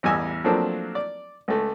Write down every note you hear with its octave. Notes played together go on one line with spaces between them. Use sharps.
A1 E2 G3 D#5 G#5 E6
F3 F#3 A3 A#3 C4 D4
D5
C#2 A3